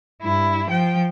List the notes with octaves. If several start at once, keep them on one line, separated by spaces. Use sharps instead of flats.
G2 E4
F3 G5